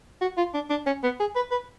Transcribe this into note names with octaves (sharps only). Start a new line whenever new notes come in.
F#4
F4
D4
D4
C#4
B3
G#4
B4
B4